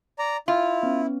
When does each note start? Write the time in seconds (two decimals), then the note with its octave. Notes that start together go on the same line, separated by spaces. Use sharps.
0.19 D5 A#5
0.48 E4 F4
0.83 B3 C#4